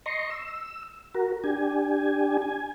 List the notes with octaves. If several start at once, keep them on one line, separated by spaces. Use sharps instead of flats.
D#5 A#5 C6 C#6
E6
F#4 A#4
D4 G4 G#5
G#5